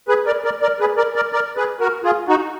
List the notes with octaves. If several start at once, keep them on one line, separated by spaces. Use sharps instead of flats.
G#4 B4
A#4 D5
A#4 D5
A#4 D5
G#4 B4
A#4 D5
A#4 D5
A#4 D5
G#4 B4
F#4 A#4
F4 G#4
D#4 F#4